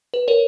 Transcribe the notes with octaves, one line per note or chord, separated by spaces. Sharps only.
B4
A#4 C#5